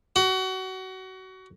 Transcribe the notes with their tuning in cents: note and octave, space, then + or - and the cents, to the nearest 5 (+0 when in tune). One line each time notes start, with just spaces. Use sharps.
F#4 +25